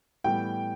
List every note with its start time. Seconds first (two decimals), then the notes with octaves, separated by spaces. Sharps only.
0.24 A2 E3 G3 B3 G5